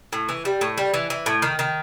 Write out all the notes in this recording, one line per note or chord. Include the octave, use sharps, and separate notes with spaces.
A2
E3
G3
A2
G3
E3
E3
A2
D#3
D#3